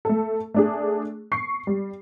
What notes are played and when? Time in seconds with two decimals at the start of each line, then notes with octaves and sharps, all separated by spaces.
0.05 A3 A4
0.54 A3 D4 G#4
1.32 C#6 C7
1.67 G3